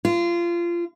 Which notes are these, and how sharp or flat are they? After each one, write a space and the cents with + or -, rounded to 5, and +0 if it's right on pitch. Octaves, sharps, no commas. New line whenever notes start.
F4 -25